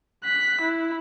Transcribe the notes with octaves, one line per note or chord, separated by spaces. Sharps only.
F#6 B6
E4